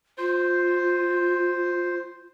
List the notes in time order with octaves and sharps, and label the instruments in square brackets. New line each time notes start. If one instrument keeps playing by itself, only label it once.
[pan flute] F4 [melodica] C5